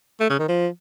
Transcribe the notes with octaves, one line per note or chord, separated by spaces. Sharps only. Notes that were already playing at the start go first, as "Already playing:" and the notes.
A3
C#3
D#3
F3